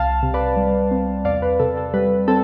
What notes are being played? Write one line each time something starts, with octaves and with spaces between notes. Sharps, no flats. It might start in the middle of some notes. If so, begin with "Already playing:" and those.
Already playing: C2 F5 A5
C3
B4 D5
G3
C4
E2 D5 F5
B4
C3 A4
A4
G3 B4
C4 A4